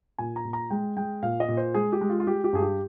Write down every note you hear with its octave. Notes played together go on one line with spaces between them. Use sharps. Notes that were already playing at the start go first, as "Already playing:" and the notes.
A#2 G#5
A#5
A#2
A#5
G#3 G5
G#3 G5
A#2 F5
D#5
A#2
C5
G#3 G#4
G4
G#3
F4
F4
G#3 G4
G4
G2 G#4
G4